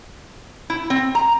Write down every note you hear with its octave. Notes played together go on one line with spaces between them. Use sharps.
E4
C4
A#5